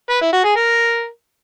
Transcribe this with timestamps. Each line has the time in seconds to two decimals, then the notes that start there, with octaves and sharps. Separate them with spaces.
0.09 B4
0.21 E4
0.33 F#4
0.44 G#4
0.56 A#4